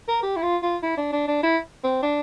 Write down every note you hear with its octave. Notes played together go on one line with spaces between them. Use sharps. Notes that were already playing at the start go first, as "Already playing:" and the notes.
A#4
G4
E4
F4
F4
E4
D4
D4
D4
E4
C4
D4